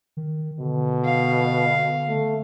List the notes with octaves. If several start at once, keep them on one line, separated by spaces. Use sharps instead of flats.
D#3
B2 D3
F5
A3